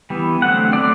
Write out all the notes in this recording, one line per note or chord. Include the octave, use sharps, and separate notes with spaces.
E3 G3 B3
D3 F#3 A3 C4 F#5
D3 F#3 A3 C4 D5